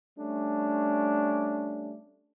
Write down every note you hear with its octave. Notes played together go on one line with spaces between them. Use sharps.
G3 A3 C#4 D4